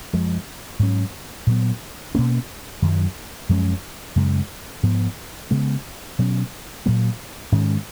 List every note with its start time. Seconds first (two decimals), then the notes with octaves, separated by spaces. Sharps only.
0.13 F#2 F3 G#3
0.79 G#2 F#3 C#4
1.47 A#2 F#3 B3
2.15 B2 A#3 C#4
2.82 F#2 D#3 F#3
3.49 F#2 F3 G#3 C#4
4.16 F#2 C#3 G#3
4.83 G#2 F3 B3
5.51 C#3 G#3 B3
6.19 B2 F#3 C#4
6.86 A#2 F#3 A#3
7.52 G#2 D#3 G#3 C#4